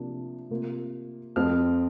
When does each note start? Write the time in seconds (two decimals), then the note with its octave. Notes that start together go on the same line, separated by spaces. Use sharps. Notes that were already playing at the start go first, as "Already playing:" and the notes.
Already playing: C3 F3 A#3 D4
0.50 C3 A#3 F4
1.36 F2 F3 C4 F4 F6